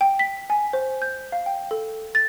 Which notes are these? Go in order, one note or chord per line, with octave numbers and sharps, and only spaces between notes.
G5
B6
G#5
C5
G6
F5
G5
A4
A6